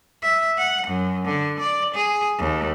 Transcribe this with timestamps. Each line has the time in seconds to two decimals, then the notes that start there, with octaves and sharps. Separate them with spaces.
0.23 E5
0.58 F#5
0.87 F#2
1.25 D3
1.60 D5
1.94 G#4
2.39 D#2